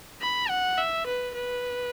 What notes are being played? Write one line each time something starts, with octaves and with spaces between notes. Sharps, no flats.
B5
F#5
E5
B4
B4